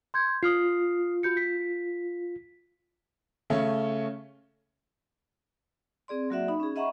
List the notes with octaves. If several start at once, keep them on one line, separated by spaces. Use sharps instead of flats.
C6 G6 G#6
F4 D#6 F6 C7
F#4 G6 C#7
B6
C#3 A3 C#4
C4 G#4 D5 C6
F#3 A#3 F#4 D5 E5 F#5
D#4 B5
C#4 G#4
D#5 E5 F#5 A#5 B5 C#6